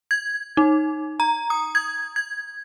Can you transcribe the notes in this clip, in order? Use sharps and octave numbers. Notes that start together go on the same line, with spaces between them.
G#6
D#4
A#5
D#6
G#6
G#6